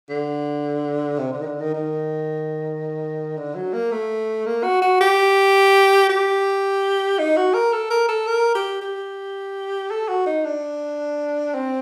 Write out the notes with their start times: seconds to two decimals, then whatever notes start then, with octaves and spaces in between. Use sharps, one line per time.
0.10 D3
1.18 C3
1.33 D3
1.41 D#3
1.46 D3
1.60 D#3
1.74 D#3
3.37 D3
3.55 F#3
3.73 A#3
3.92 A3
4.46 A#3
4.63 F#4
4.82 F#4
5.01 G4
6.09 G4
7.19 D#4
7.36 F#4
7.54 A#4
7.73 A4
7.90 A#4
8.09 A4
8.27 A#4
8.55 G4
8.81 G4
9.91 A4
10.09 F#4
10.26 D#4
10.45 D4
11.54 C4